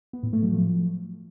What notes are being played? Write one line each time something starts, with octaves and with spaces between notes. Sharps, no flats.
B3
A2
A3
F#3
F3